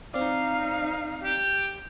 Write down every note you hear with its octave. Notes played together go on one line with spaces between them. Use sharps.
C4 D#4 D5 F5
G4